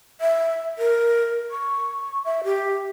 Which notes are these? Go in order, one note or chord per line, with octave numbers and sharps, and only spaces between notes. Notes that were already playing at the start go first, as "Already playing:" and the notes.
E5
A#4
C#6
E5
G4